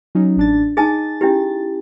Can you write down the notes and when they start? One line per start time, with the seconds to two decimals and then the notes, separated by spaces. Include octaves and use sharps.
0.15 F#3 C#4 D#4
0.37 A1 D4 A6
0.77 D#4 G#4 G#5 A5 A6
1.21 C#4 E4 G4